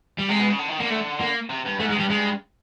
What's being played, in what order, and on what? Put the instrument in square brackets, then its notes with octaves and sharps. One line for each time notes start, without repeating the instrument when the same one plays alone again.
[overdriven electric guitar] G3
[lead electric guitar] C3 [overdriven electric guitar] G#3
[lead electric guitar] B2
C#3
D3
D#3
[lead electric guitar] D3 [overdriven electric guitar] A#3
[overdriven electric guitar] A3
A#3
[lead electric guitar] C3
G2
[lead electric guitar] G#2 [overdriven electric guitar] A3
[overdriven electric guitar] G#3
[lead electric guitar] G2 [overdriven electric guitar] G3
[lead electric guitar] G2 [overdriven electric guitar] G#3